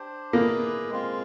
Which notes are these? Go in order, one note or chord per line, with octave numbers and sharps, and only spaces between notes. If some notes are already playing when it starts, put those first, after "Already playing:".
Already playing: D4 G4 C5
A#3 E4 G#4 B4 D5
G#3 C4 F4